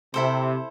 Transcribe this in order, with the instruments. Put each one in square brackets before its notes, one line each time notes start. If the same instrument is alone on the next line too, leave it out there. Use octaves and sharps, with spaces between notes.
[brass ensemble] C3 [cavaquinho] E4 A4 C5